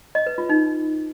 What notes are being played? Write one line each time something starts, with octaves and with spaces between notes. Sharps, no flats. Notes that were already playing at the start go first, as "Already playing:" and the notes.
D#5
B4
F4
D#4